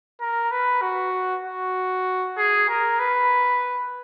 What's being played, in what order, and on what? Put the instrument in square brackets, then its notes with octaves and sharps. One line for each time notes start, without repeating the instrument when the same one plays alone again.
[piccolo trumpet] A#4
B4
F#4
F#4
G#4
A#4
B4